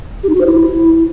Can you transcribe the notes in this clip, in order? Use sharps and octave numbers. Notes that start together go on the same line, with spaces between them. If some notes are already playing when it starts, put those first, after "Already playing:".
G4
D#4
F#4
C5
E4